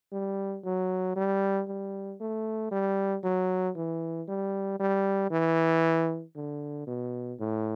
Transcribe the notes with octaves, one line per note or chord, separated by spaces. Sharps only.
G3
F#3
G3
G3
A3
G3
F#3
E3
G3
G3
E3
D3
B2
A2